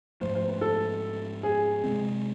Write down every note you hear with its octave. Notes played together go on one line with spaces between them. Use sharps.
G#2 F3 A3 C5
C5
B4
A4
G#4
C3 G#3 C4